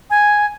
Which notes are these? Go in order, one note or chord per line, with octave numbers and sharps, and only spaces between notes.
G#5